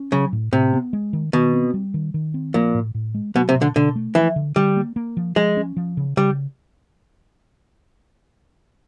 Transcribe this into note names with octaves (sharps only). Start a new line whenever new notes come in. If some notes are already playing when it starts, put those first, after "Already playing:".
Already playing: C#4
C#3 F#3
A2
A2 C3
B3
G#3
D#3
B2 D#3
C4
G3
D#3
D#3
C4
A#2 F3
A2
A2
G#3
B2 F#3
C3
B2
D3
B2 D3
A3
E3 F3
D3
D3 G3
A#3
A#3
F3
F3 G#3
C#4
F3
C#3
C#3 G3